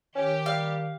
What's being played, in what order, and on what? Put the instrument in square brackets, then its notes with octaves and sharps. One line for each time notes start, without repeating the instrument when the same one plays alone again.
[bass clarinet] D#3 [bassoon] C#4 [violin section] G4
[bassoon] G3 [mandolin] F5